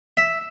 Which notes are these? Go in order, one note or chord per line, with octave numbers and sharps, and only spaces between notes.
E5